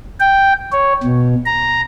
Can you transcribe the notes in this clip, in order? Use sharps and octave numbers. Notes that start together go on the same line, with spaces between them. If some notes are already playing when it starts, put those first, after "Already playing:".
G5
C#5
B2
A#5